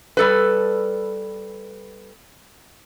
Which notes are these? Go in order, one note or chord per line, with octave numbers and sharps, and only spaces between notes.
G3 A4 B4